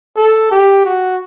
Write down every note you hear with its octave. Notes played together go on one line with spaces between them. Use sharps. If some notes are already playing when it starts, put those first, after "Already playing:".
A4
G4
F#4